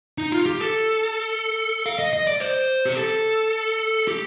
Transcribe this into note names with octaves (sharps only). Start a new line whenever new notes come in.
D#4
F4
G4
A4
F5
D#5
D#5
D5
C5
G4
A4
G4